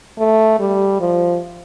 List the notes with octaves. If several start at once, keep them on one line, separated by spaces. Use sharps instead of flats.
A3
G3
F3